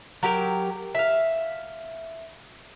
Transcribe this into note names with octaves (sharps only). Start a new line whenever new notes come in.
F#3 G4 A#4
E5 F5